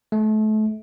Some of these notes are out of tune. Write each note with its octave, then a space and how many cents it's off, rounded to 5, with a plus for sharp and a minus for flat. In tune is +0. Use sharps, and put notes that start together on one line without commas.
A3 -30